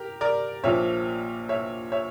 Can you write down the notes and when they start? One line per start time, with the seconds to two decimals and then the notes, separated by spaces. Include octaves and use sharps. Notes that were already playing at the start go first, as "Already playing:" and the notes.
Already playing: G4 A#4
0.21 A#4 D5
0.63 A#1 A#2 F3 C#5 E5
1.49 C#5 E5
1.92 C#5 E5